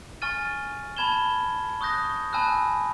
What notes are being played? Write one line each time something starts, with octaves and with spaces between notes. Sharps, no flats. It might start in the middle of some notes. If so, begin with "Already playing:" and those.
G#5 C#6 F6 A6 D#7
A5 B5 G#6 E7 G7
C#6 D#6 F#6 G6 A#6
G#5 A5 B5 E6 F#6